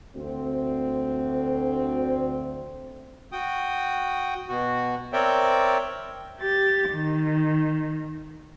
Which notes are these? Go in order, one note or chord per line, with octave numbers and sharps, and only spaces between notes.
D2 C4
F#4 G5 D#6
B2 F#4
C4 A#4 C#5 D5 E5 G5
G4 A6
D#3